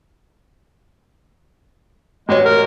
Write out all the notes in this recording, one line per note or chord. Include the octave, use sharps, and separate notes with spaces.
A1 G#3 F#4 C#5
A#4